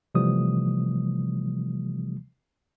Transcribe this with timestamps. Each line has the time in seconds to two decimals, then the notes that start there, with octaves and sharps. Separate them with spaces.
0.15 C3 E3 F3 G3 A3 D#6